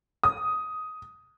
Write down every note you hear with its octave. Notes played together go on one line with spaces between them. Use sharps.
D#6